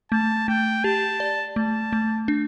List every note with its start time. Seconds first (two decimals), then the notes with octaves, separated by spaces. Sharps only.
0.12 A3 A5
0.48 A3 G5
0.84 G4 A5
1.20 D5
1.56 A3 A5
1.93 A3
2.28 D4